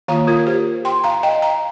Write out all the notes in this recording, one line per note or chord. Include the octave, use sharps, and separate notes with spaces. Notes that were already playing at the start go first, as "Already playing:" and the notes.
D#3 A#3 F4 F5 A#5
F4 A#4
G4 C5
G5 C6
F5 A#5
D#5 G5
F5 A#5